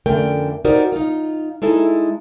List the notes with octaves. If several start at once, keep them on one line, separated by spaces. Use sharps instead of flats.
F2 D3 A3 C#4 A#4 G5
D#4 F#4 G4 A#4 C5 D5
D#4 F4
G#3 D#4 E4 A4 E5